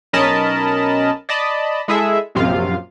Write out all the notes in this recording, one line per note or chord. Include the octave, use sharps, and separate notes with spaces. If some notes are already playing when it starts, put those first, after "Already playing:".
B1 C#4 A#4 D#5 A5 B5
D5 D#5 A5 B5
G#3 E4 G#4 A4 E5
A#1 F#2 C3 F4 F5